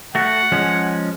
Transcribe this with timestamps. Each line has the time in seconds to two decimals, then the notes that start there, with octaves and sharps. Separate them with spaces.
0.15 A3 F#4 F#5
0.52 F3 G#3 C#4